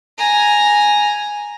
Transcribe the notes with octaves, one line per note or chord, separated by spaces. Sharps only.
G#5 A#5